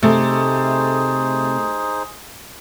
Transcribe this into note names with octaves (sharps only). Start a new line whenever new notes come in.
C3 A3 D#4 G#4 C5